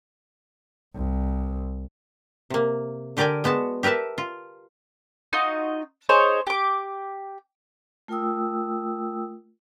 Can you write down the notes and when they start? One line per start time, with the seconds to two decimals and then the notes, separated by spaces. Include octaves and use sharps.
0.95 C2
2.50 C3 A#3
3.17 D3 G4 A#4 D5 G5 G#5
3.44 G#3 B3 F#4 A5
3.83 G4 A#4 B4 E5 A5
4.18 F4
5.33 D#4 F4 F#4 D#5
6.09 D#4 G#4 C5 C#5
6.47 G4 D6
8.08 A3 F4 A#4 G5 D#6 E6